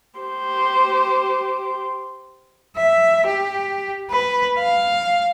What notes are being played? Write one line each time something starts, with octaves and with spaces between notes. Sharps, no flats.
G4 C5
E5
G4
B4
F5